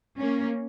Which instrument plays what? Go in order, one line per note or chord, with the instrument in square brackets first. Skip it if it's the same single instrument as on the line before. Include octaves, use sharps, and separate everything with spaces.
[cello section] A#3 C#4